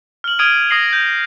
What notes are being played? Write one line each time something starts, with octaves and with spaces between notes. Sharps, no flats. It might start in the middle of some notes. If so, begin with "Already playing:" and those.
F6 F#7
D#6 F6 G#6 D7 D#7
D#6 A#6 C7 F#7
G6